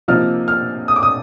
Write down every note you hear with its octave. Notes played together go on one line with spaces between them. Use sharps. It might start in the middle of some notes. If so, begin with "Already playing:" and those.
C3 F3 A#3 D#4 F6
F6
D#6
D6
D#6